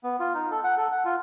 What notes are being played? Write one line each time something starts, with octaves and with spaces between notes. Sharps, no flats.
B3
F4
D#4
A4
F#5
A4
F#5
F4